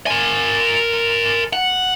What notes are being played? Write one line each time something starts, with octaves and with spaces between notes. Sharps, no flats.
A#4 G#5
F#5